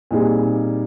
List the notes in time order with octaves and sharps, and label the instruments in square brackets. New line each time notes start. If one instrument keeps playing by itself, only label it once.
[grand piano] A#2 G3 C4 D#4 G#4